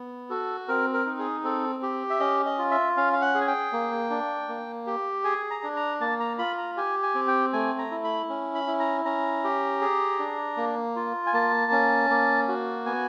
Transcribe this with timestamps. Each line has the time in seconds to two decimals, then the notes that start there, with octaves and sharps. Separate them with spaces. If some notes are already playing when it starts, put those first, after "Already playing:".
Already playing: B3
0.30 F#4 A4
0.68 C4 A#4
0.93 A#4
1.06 D#4
1.19 G#4
1.44 C4 A4
1.83 G4
2.10 E5
2.20 C#4 D#5
2.46 D#5
2.58 F4
2.71 E5
2.97 C#4 F5
3.13 F5
3.22 F#5
3.35 G#4
3.41 G#5
3.47 G5
3.72 A#3
4.10 D4
4.48 A#3
4.87 G4
5.24 G#4 G#5
5.51 A#5
5.63 D4
5.76 A#5
6.00 A#3 A5
6.20 A#5
6.39 F4 B5
6.58 A#5
6.77 G4 G#5
7.03 G#5
7.15 C4
7.28 G5
7.53 A3 G#5
7.79 A#5
7.91 E4
8.04 B5
8.29 C#4
8.55 B5
8.67 E4
8.80 A#5
9.05 C#4 A#5
9.44 G4
9.81 G#4
10.19 D4
10.57 A#3
10.96 F4
11.26 G#5
11.33 A#3 A5
11.72 C#4
12.10 A#3
12.48 F#4
12.86 B3 G#5